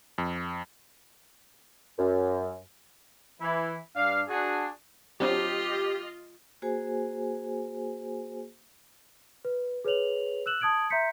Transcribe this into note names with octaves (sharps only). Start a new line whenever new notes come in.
F2
F#2
E3 E4
G2 D4 F5
D4 F#4 G#4
F#3 C4 D4 F4 G4 D#5
A#3 F#4 G#4 C5 G#5
B4
G#4 B4 C#5 F7 F#7
E6 F#6 E7 F#7
A5 D#6 G#6 D7 F#7
E5 A#5 C6 G6 B6 C#7